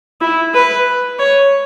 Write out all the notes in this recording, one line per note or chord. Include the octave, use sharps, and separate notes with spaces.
E4
B4
C#5